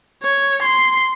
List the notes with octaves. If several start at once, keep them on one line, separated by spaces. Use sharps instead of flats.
C#5
C6